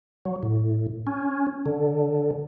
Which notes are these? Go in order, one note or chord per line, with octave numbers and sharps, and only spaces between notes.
F#3
A2
C#4
D3